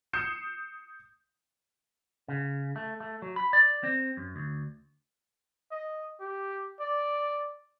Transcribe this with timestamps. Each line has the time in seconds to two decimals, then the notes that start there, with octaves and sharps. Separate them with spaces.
0.13 D#6 G6 C7 C#7 E7
2.28 C#3
2.76 A3
3.00 A3
3.22 F#3
3.36 B5
3.53 D5
3.83 C4
4.17 F#2
4.36 D2
5.71 D#5
6.20 G4
6.80 D5